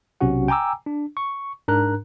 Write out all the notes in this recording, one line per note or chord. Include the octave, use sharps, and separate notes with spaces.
B1 C3 C#4 F#4 F#5
G5 G#5 A#5 D6 E6
D4
C#6
G#2 D4 A#4 A#5 F#6